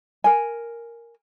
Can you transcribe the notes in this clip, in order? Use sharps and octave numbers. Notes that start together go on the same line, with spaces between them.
A#4 G#5